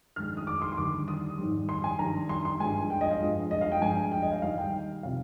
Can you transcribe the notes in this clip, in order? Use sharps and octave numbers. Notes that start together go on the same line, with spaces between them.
G2 D#3 G#3 F6
D#6
D6
C6
C6
D#2 D3 G3 D6
D#6
G#2 D#3 G3
C6
G#5
G2 D#3 G3 A#5
C6
C6
G2 F3 G#3 G#5
G5
D#5
F5
G2 F3 G#3
D#5
F5
G5
G2 F3 G#3 G#5
G5
D#5
F5
D#2 D#3 G3 F5
G5
C3 F3 F5